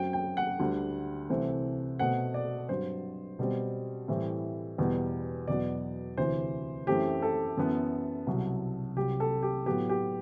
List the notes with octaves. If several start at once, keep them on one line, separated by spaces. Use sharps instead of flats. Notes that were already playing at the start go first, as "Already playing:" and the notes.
Already playing: F#2 F#3 C4 G5
G5
F#5
D2 D3 G3
C2 C3 E3 A3 C4
B2 A3 C4 F#5
D5
G2 F#3 C4 C5
B2 G3 C4
A2 E3 G3 C4
E2 B2 G3 B3
E2 B2 F#3 B3 D5
D2 C3 E3 C5
F#2 E3 A3 C4 G4
A4
F#2 E3 B3
C2 B2 F#3
C2 C3 F#3 G4
A4
G4
A2 F#3 B3 G4
G4